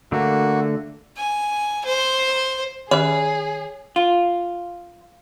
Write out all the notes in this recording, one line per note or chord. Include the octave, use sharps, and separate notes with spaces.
D3 A3 A#3 F#4
G#5
C5
D#3 C#4 G4 G#4 B4 C#5 E5 B5
F4